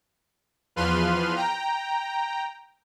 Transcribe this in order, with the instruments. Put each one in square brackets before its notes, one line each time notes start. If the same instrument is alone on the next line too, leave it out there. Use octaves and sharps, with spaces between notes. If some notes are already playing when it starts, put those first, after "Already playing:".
[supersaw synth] E2 F3 B4 C6 F6 D#7
G5 A#5